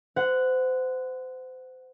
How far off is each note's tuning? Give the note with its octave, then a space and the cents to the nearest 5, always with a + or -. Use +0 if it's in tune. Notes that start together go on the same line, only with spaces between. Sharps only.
C5 -30 F#5 +0